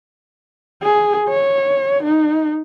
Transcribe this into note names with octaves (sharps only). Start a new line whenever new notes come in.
G#4
C#5
D#4